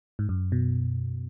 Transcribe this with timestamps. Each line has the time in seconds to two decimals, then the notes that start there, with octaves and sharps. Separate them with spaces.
0.19 G#2
0.29 F#2
0.52 B2